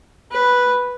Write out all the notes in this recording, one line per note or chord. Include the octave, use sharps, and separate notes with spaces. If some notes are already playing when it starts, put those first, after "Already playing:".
B4